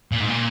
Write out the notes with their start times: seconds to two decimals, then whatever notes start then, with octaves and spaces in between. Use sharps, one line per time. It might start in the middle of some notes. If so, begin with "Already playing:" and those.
0.12 A#2
0.20 G#2
0.28 A#2